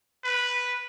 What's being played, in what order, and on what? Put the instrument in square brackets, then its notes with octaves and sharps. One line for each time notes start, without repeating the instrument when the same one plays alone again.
[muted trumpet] B4